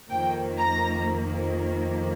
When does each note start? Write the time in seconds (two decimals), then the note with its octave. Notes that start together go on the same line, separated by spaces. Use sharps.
0.10 F2 D#3 A#3 G5
0.57 A#5